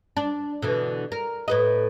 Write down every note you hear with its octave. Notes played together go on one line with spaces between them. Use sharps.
D4
B2 D3 E3
A#4
A2 B4 D#5